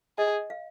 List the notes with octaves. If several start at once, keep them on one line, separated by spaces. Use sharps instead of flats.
G#4 D#5
F5